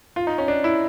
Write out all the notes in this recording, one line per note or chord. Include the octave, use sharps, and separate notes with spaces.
F4
D#4
C#4
D4
E4